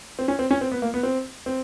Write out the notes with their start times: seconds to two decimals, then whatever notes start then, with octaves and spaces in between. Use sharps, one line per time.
0.19 C4
0.28 C#4
0.39 C4
0.51 C#4
0.61 C4
0.72 B3
0.82 A#3
0.94 B3
1.03 C4
1.46 C4